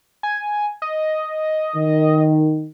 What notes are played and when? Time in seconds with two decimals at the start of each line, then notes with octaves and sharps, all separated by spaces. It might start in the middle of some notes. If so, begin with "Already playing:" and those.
0.23 G#5
0.82 D#5
1.76 D#3